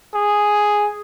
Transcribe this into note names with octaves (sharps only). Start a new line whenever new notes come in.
G#4